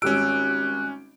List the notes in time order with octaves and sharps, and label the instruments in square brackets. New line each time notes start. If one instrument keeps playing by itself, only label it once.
[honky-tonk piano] G#1 G3 E6 [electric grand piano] C#4 D7 [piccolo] F#6